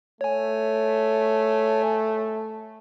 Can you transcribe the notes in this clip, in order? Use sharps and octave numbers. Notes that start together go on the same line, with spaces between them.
A3 C#5 G#5